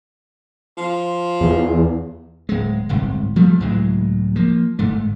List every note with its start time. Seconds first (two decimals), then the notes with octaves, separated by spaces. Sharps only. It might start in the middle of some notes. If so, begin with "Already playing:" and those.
0.77 F3
1.41 E2
2.49 D1 G#3
2.89 D1 G1 C2 G#2
3.36 F3 G3 A3
3.60 C#2 A2 F#3 G#3
4.36 F3 A#3
4.79 G1 G#2 A3